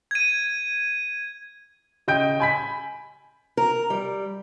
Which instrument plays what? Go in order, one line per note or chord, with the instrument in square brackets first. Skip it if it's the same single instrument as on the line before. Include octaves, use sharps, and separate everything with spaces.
[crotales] G#6 D#7
[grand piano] C#3 D#5 G5 G6 D7
G#5 B5 B6
[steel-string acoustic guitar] A#4
G3